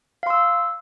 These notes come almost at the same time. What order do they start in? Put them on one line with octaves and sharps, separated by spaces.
F5 C6 E6